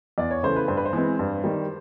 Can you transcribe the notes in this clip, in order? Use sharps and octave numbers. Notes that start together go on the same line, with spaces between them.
E2 D5
C#5
C#3 E3 A3 C5
B4
G2 C5
B4
C5
E3 G#3 C4
G2
D#3 G3